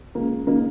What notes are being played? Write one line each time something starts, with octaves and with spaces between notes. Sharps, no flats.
C#2 A#3
C#3 A#3 D#4